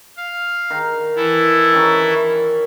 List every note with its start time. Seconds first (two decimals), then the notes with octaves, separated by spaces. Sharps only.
0.17 F5
0.70 D#3
1.16 E3 E4 A4
1.73 D#3 C#4